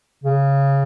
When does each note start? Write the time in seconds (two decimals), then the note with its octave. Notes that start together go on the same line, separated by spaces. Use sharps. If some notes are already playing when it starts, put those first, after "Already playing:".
0.24 C#3